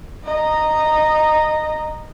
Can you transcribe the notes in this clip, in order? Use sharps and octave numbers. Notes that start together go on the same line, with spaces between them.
D#5 A#5